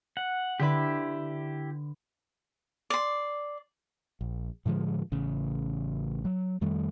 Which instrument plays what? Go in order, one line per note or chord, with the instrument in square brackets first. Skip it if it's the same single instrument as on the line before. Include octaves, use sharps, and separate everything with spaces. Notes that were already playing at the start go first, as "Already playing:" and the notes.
[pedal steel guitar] F#5
[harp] D3 D4 B4 [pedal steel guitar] E4 G4
[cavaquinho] D5 C6
[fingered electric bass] A#1
A2 D3 F3 G#3
A1 C#3
F#3
F2 D#3 G3 A3